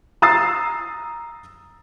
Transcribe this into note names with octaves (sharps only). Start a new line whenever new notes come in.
A#5 D#6 E6 A6 C7